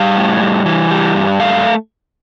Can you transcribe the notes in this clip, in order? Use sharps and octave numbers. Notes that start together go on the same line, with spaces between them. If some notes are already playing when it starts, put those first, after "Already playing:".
Already playing: G3 F5
A2
G3
E3
G3
G2
A3 F5